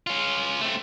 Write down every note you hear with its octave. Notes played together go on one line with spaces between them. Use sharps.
C#4 F4
A3 C4